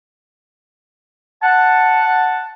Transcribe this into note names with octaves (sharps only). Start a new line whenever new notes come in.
F#5 A5